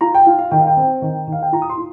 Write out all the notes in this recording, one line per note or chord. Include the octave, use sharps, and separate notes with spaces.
F4 A#5
G5
F4 F5
F5
D#3 G5
F5
G5
C4
D#3
D#3
F5
G5
F4 A#5
D#6
C6
F4